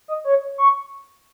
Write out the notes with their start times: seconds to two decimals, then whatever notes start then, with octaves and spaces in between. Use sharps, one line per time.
0.08 D#5
0.24 C#5
0.58 C#6